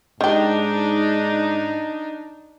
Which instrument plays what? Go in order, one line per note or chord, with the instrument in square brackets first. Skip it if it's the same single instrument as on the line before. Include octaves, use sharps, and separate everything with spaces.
[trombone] G#2 [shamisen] D#3 G4 [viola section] D4 D#4